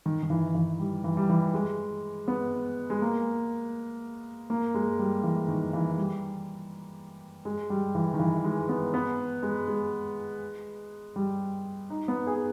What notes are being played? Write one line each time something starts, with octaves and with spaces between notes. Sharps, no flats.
D#3
D#3
E3
E3
G3
E3
G3
E3
G#3
B3
G#3
A#3
A#3
G#3
G3
E3
D#3
E3
G3
G#3
G3
E3
D#3
E3
G#3
B3
B3
G#3
G#3
G3
D#4
B3
G#4